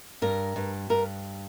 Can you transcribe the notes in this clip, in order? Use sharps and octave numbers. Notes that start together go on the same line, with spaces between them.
G2 A#4
G2
G2 A#4